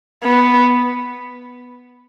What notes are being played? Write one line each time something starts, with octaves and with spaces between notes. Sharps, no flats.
B3